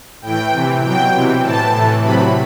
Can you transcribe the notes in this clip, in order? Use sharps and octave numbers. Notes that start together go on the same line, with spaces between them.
A2 E3 G5
C3 E3
B2 F#3 G5
C3 E3
A2 E3 A5
A2 E3
C3 F#3 B5